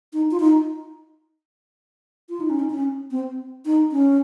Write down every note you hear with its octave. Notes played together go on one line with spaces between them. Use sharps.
D#4
F4
D#4
F4
D#4
C#4
D#4
C#4
C4
D#4
C#4